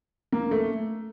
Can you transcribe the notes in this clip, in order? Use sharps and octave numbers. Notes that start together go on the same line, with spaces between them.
A#3
A3